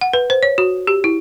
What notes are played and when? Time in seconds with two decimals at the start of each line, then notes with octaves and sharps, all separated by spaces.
0.01 F#5
0.13 B4
0.30 C5
0.43 C#5
0.58 F#4
0.87 G4
1.04 E4